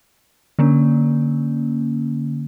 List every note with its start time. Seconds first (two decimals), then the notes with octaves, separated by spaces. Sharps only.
0.59 D3 A#3 C#4